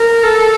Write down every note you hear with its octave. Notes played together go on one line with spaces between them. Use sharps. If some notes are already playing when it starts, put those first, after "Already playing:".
Already playing: A#4
A4